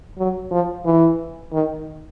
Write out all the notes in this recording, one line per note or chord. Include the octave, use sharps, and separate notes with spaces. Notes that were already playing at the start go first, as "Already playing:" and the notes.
F#3
F3
E3
D#3